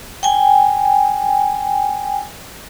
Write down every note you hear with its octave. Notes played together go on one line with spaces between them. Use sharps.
G5 G#5